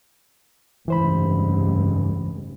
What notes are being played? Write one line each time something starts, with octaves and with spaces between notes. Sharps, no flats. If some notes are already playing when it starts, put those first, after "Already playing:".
F1 C#2 G2 E3 C5 B5